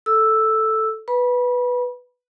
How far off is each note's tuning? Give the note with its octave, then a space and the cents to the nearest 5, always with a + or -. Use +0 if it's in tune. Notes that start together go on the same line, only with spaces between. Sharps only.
A4 +0 E6 +0
B4 +0 B5 -30